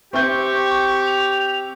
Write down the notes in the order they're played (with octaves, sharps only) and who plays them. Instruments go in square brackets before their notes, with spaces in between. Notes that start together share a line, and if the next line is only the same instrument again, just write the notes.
[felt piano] C4 E5 G6 [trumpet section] G4 [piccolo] C#6
[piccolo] F7